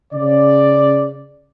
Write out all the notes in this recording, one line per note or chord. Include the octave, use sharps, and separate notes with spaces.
C#3 D5